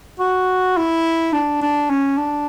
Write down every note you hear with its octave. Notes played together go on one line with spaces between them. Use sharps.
F#4
E4
D4
D4
C#4
D4